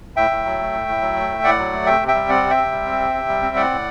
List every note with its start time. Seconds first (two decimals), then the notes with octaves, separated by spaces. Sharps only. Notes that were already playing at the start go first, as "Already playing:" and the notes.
0.16 A2 E5 G5
0.31 A2
0.45 F#3
0.59 A3
0.73 A2
0.88 A2
1.02 F#3
1.16 A3
1.30 A2
1.44 A2 D5 F#5
1.58 F#3
1.73 A3
1.86 C3 E5 G5
2.01 C3
2.08 E5 G5
2.15 G3
2.29 C4 D5 F#5
2.43 C3
2.50 E5 G5
2.57 C3
2.71 G3
2.86 C4
3.00 C3
3.14 C3
3.28 G3
3.42 C4
3.56 A2 D5 F#5
3.70 A2